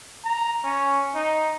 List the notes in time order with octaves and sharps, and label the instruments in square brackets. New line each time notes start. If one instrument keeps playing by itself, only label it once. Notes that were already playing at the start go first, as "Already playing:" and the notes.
[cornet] A#5
C#4
D#4